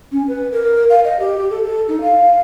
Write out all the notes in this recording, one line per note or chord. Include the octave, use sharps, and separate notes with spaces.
C#4
B4
A#4
F5
D#5
G4
G4
A4
A4
D#4
F5